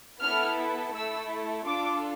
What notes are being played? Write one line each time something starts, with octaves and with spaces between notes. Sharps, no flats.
B3 E4 A4 F6
A3 E4 A4 E6
D4 F4 A4 D6